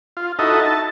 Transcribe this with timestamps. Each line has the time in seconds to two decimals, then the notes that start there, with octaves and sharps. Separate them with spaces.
0.17 F4
0.39 D#4 E4 F#4 A4 D#5
0.60 A5